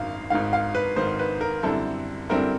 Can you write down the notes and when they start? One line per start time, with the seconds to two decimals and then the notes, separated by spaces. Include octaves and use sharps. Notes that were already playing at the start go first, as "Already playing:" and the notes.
Already playing: G#1 F#2 D#3 F5
0.30 G#1 G#2 D#3 F5
0.53 F5
0.75 B4
0.96 G#1 G#2 D#3 C5
1.19 B4
1.41 A#4
1.63 F#2 D3 G3 C4 E4 A4
2.29 F#2 D3 G3 C4 E4 A#4